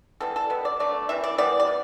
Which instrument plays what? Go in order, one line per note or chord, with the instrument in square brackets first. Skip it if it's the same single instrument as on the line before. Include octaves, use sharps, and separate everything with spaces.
[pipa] E3 G3 B3 A4
A4
B2 G3 B3
D5
D3 F#3 A3 D5
C3 E3 E5
D5
E3 G3 B3 D5
D5
C3